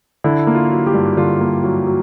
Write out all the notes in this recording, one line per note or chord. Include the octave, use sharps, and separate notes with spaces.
D3 E4
A#3
F4
F#3
G4
G2
D3 F4
A#3
F#3
F#3